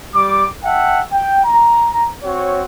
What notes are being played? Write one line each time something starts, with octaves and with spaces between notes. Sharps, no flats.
G3 D6
E5 F#5 G5 A5
G5
A#5
C4 F#4 C#5